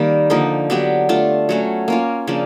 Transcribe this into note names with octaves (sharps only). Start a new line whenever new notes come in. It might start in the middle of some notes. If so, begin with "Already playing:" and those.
Already playing: D#3 G3 A#3
D3 F3 A#3 D#4
F#3 B3 D4 G4
A3 D4 F4
F#3 A3 C#4
A#3 C#4 F4
C#3 F3 A#3 D4